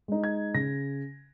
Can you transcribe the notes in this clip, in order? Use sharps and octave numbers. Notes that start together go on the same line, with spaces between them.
G#3 D#4
G#6
C#3 A#6